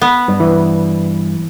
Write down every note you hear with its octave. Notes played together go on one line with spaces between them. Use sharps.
B3
G2
E3